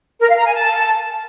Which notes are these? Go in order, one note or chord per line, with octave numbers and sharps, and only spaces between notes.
A#4
F5
A#5
G#5
A5